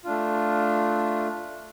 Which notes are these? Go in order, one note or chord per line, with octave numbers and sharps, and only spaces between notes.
A3 D4 F4